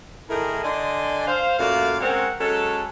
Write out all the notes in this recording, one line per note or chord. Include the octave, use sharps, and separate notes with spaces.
A2 D#3 A3 E4 G#4 A#4
D3 D5 D#5 G#5 C6
C5 F5
F#2 A#2 A3 F#4 D5 F5
G#3 C4 C#4 A#4 F#5
F#3 G#3 C#4 A4